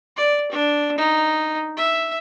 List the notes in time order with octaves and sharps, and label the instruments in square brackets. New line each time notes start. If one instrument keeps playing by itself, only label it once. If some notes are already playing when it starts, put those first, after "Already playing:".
[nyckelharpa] D5
D4
D#4
E5